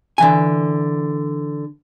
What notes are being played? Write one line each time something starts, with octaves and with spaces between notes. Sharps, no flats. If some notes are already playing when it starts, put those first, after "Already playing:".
D3 E3 G#5